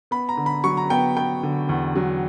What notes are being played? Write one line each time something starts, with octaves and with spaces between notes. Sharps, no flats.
B3 B5
A#5
D3
B5
F#3 C#6
A#5
B3 G5
B3 G5
D3
E2
F#3